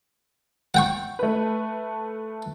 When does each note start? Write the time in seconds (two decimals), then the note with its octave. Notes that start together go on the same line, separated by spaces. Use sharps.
0.74 F#5 G5 C#6
1.19 A3 B4